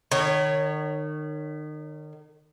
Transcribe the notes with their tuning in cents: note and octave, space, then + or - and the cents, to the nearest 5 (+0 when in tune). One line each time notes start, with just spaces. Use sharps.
D#3 -35 C#5 +0